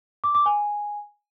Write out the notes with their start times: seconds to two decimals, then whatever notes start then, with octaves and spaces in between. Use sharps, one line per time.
0.24 D6
0.35 D6
0.46 G#5